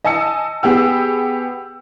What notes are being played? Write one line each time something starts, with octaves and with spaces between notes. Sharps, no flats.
D#5 G#5 A5 E6 C#7
B3 G4 G#4 G5 E6